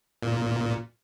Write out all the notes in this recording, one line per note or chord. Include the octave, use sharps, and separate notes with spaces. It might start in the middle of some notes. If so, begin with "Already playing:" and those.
A#2